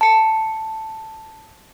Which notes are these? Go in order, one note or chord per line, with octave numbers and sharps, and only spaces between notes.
A5 C#7